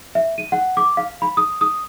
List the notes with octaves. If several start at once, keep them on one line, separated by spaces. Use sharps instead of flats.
E5
D#7
F#5
D6
F5
B5
D#6
D#6